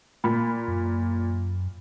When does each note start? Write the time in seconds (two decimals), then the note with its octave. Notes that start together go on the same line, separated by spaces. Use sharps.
0.24 A#2 B5
0.68 F#2